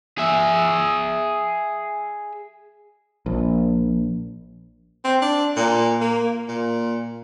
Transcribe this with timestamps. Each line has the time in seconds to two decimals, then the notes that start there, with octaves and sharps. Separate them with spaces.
0.18 G#4 E5
3.26 A#1
5.05 C4
5.22 D4
5.57 A#2
6.01 A#3
6.49 A#2